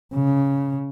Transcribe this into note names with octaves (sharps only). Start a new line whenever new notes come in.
C#3